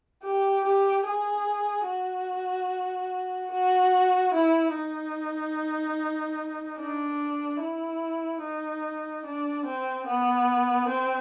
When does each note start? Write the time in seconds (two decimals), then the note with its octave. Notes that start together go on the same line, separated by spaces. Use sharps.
0.23 G4
0.64 G4
1.05 G#4
1.87 F#4
3.51 F#4
4.33 E4
4.74 D#4
6.78 D4
7.61 E4
8.42 D#4
9.25 D4
9.65 C4
10.07 B3
10.88 C4